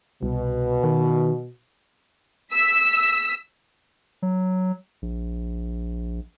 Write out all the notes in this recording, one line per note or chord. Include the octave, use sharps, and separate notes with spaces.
C2 B2
D#3
E6 B6
F#3
A#1